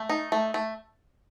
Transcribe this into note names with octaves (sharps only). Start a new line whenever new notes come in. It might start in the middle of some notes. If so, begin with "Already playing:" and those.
Already playing: A3
D#4
A3
A3